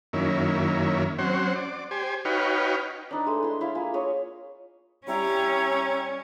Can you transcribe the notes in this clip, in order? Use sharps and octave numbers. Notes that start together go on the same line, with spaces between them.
F#2 D#3 A#3 C#4 E4
F#3 C4 C#4 C5 F#5
D5
G4 C5 G#5
D#4 F#4 B4 C#5 F5 G5
D4 D#4 B4
G#3 A3
E4 C6
E4 E5 F5
A#3 F4 G#4
G#4 C#5 D#5
G3 C#4 E4 G5 A#5